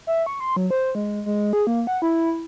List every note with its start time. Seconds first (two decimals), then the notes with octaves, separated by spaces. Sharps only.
0.07 E5
0.26 C#6
0.40 C6
0.56 F#3
0.71 C5
0.95 G#3
1.26 G#3
1.53 G#4
1.67 A#3
1.87 F#5
2.02 E4